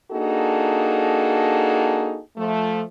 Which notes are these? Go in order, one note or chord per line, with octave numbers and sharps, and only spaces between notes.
A#3 D4 D#4 F#4 G#4 A4
F3 A3